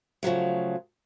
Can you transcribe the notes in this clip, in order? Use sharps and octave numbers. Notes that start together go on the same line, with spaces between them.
C#3 F3 F#3 A3